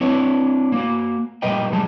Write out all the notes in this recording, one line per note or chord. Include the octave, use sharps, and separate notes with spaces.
C4 D4 E4 B4 C#5
A#3 F#4
A#2 G3 A#4 B4 D#5 G5
G#2 E3 G3 G#4 A5